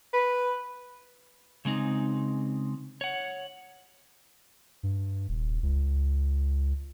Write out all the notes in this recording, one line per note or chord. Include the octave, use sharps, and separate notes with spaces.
B4
C#3 G#3 C4 D#4
C#5 F#5
G2
D#1
C#2